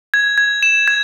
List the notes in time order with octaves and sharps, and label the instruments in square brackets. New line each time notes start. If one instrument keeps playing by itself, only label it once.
[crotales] G#6
G#6
E7
G#6